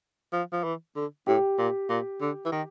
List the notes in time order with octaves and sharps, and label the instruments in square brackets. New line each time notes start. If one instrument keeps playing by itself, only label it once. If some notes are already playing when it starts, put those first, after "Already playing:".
[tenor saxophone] F3
F3
E3
D3
[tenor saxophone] A2 [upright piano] G4
[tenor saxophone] A#2
A#2
D3
E3
D#3